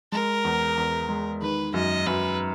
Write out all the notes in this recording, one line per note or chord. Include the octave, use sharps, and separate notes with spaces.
G#3 A#4
E2
E2
G#3
D#3 B4
F#2 D#5
F#2 B4